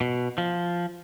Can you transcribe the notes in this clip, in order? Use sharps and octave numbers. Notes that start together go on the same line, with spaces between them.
B2
F3